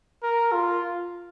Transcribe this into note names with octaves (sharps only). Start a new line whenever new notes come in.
A#4
F4